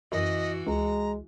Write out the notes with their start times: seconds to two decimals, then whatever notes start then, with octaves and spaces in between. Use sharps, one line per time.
0.12 F#2 E3 F#4 D#5
0.67 C#2 G#3 A#5